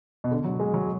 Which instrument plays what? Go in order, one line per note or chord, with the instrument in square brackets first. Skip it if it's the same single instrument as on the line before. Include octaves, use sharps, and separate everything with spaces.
[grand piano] B2
D3
F#3
G#3
F#3